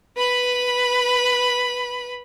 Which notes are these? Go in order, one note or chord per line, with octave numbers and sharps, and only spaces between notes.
B4 B5